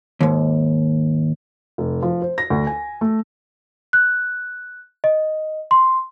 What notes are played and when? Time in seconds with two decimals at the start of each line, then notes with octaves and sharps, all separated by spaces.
0.21 D#2 G#2
1.78 F1
2.02 F3
2.22 C5
2.38 A#6
2.50 D2
2.67 G#5
3.01 A3
3.93 F#6
5.04 D#5
5.71 C6